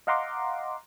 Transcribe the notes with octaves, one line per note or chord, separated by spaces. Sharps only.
D#5 F5 F#5 A#5 C6 D6